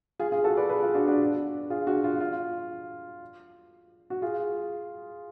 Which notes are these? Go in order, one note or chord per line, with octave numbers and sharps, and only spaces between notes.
F4 G#4
F4 G#4
F#4 A4
B4 D5
G#4 B4
F4
D4 F#4
D4 F#4
F4 G#4
D4 F#4
F4
F4
F#4
F4 G#4